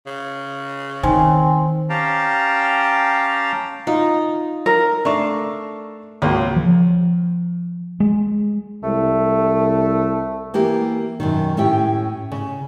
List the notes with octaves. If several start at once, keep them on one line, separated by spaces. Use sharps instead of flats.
C#3
D#3 C4 G#5
C#4 G4 F5 G5 A5 A#5
D#4 F4
A#4
A3 D4 F5 C#6
C#2 A#3 C4 F#4
F3
G#3
C2 A3
E3 A#3 B3 G4 A#4
F#2 B2 D#3
A2 C#4 E4 G4 G5
C#3